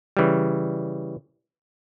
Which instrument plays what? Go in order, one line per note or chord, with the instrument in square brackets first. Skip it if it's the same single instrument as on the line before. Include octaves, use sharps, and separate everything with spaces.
[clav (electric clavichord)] C#3 E3 G3